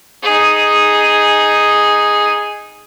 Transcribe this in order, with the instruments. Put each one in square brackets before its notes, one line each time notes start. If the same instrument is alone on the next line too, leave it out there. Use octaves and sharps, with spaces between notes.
[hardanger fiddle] D#4 G#4